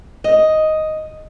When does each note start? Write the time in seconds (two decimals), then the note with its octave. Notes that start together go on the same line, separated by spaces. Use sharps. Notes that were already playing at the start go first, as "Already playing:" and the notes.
0.24 D#5